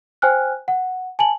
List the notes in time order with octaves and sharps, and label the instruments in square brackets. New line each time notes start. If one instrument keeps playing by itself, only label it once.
[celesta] C5 G5 G#5 F6 F#6
F#5
G#5 A5 F#7